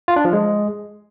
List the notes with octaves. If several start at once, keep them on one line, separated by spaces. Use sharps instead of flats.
F4
D4
F3
G#3